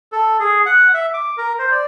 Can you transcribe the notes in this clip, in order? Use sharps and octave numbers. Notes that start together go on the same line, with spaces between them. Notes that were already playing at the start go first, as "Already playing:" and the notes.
A4
G#4
F#5
E5
D6
A#4
C5
D5